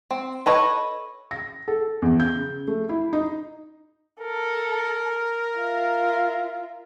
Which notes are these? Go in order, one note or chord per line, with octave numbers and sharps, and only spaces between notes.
C4
A4 B4 C#5 D#5
A#6
A4
E2
G6
C#3
A3
E4
D#4
A4 A#4
F4 E5